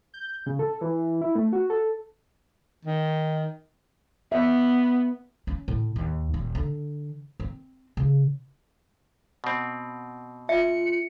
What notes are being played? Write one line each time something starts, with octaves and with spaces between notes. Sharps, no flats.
G6
C#3
A4
E3
E4
A3
F#4
A4
D#3
B3 E5
C#4
A2
D#2
D#1
D3
C4
C#3
B2 C4
F4 E5 C#7